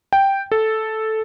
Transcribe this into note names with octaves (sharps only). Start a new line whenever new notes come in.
G5
A4